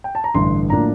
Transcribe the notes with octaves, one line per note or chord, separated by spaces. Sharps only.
G5
A5
A#5
A1 G2 D3 C6
A2 F3 A#3 D4 A#5